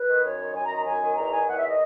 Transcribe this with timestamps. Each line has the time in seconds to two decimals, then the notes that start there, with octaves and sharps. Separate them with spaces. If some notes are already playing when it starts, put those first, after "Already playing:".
Already playing: B4
0.08 D#3
0.24 F#2 C#5
0.39 D#3
0.55 F#2 G#5
0.66 A#5
0.70 D#3
0.76 A#5
0.85 F#2 G#5
1.01 D#3
1.17 E2 A#5
1.32 D#3 G#5
1.48 E2 F#5
1.58 E5
1.63 D#3
1.69 D#5